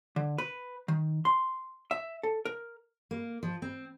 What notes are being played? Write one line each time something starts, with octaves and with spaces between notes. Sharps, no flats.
D3
B4
D#3
C6
E5
A4
A#4
A#3
F3
C4